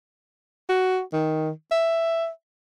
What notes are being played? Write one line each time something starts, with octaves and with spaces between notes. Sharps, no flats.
F#4
D#3
E5